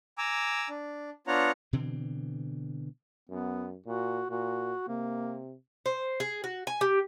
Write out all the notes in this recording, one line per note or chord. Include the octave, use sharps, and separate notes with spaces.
G#5 A#5 D6 E6
D4
B3 D4 F4 C#5 F#5 A#5
B2 D3 E3 C4
F#2 B3
A#2 F#4
A#2 F#4
C3 A#3
C5
G#4
F#4
G#5
G4